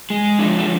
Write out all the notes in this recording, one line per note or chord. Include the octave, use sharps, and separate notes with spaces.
G#3
F3 D4
D4